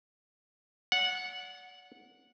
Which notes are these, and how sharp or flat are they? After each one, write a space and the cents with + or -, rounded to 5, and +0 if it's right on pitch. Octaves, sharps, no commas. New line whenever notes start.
D5 -45 F#5 -15